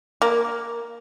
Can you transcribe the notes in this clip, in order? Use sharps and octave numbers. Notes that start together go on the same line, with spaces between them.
A#3